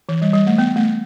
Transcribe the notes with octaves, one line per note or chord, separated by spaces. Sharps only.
E3
G3
G3
A3
B3
A3